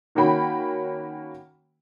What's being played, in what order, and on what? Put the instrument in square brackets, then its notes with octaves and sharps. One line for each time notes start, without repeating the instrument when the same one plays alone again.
[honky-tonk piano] D#3 A#3 C#4 F#4 G5 B5